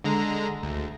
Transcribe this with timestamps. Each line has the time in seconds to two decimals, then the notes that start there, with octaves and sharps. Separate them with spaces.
0.04 D3 G#3 A#5
0.63 D2